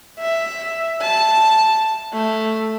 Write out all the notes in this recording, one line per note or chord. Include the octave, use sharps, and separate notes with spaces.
E5
A5
A3